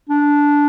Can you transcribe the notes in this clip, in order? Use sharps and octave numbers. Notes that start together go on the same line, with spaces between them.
D4